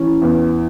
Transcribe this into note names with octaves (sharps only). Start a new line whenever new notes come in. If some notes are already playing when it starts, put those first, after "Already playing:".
Already playing: E3 C#4
E2